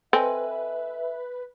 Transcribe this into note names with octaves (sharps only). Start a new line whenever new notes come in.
C4 A4 B4 D#5 E5 G#5